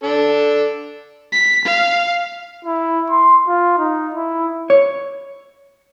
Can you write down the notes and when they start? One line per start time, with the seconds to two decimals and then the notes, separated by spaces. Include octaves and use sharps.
0.03 D4 A4
1.32 B6
1.65 F5
2.65 E4
3.10 C6
3.48 F4
3.78 D#4
4.14 E4
4.70 C#5